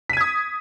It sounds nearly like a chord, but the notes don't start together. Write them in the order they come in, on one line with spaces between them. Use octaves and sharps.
B6 D#7 G#6 D#6